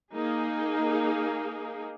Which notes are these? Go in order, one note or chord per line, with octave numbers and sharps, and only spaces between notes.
A#3 D#4 G#4